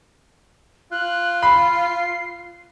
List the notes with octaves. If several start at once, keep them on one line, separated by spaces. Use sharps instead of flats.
F4 F#6
B5 C7